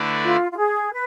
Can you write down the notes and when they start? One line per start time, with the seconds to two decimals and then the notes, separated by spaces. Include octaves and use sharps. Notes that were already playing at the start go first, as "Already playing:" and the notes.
Already playing: D3 A3 E4 B4 D5
0.23 F4
0.51 F4
0.57 G#4
0.91 B4